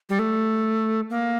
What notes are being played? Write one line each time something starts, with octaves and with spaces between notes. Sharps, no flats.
G3
A3
A#3